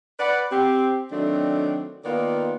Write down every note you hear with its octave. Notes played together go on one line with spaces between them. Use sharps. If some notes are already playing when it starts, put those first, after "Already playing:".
B4 D5 F#5
C4 G4
D#3 F#3 A3 C4 D4
D#3 A#3 B3 F4 A#4 D5